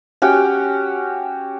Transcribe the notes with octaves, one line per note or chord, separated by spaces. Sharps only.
C#4 F#4 G4 G5